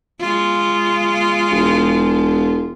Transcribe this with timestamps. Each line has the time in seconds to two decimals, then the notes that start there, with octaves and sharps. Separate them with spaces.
0.20 G#3 F4
1.52 E1